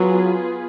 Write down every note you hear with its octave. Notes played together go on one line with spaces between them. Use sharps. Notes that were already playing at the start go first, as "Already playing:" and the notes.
Already playing: F#3 B3 F4 G#4 B4